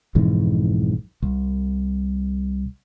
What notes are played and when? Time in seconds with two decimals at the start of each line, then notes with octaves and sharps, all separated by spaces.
0.15 B1 F2 G#2 E3
1.22 C2